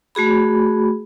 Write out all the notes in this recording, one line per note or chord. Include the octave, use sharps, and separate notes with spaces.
A3 F#4 G#4 B5